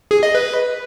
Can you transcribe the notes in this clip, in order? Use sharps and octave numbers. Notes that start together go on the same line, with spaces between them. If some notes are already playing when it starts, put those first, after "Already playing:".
G#4
D#5
B4